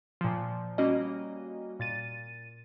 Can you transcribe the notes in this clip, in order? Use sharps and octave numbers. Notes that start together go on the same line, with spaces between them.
A#2 F3
G3 A#3 C#4 F#4 D#5
A#2 A6 D#7